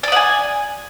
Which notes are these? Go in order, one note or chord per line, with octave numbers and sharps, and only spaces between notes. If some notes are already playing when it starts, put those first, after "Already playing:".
D5 F#5 G#5 D#6